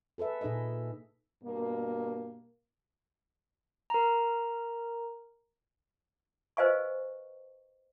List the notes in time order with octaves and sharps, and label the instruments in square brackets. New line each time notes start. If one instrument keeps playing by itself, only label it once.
[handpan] G#4 A4 B4 E5
A#2 D#4 G#4 A4 D#5
[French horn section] G2 B2 A#3
[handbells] A#4 A#5
[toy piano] B4 C5 D#5 F5 G#5 C#6